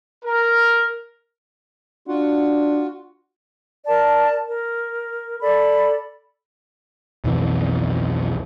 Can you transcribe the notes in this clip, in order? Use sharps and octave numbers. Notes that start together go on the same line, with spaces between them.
A#4
D4 F4 F#4 F#5
A#4 D5 A5
A#4
A4 D5 B5
B1 F2 E3